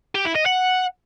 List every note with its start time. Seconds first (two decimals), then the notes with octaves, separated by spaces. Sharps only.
0.15 G4
0.25 E4
0.36 D#5
0.46 F#5